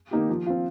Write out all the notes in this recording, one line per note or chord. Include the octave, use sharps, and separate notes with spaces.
D#3 A#3 D#4 G4
F3
C4 F4